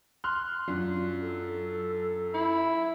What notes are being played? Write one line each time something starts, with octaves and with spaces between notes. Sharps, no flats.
C6 F6 F#6
F#2 F#3 D4 F4
A4
E4